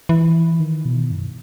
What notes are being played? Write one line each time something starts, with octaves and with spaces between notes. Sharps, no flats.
E3
D#3
B2
F#2